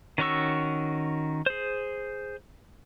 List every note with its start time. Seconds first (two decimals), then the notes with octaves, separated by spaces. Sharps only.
0.18 D#3 C#4 F#4 C#6 E6
1.46 G#4 C5